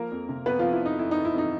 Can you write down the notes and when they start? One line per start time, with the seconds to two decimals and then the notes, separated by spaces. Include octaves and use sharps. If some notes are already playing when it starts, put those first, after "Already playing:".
Already playing: F3 A#3 A#4
0.11 F2
0.29 C3
0.46 F2 B3 B4
0.59 F3 F4
0.64 F2
0.73 E4
0.81 F2 D#4
0.99 F2 E4
1.11 D#4
1.16 F2
1.25 E4
1.34 F2 D#4